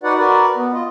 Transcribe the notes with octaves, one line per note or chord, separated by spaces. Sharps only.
D#4 F#4 B4 D5 F#5
F#4 A#4 B4 D5
B3
F4 D#5